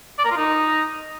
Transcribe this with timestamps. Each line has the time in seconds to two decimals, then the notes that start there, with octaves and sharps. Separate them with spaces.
0.18 D5
0.25 A#4
0.31 F4
0.37 D#4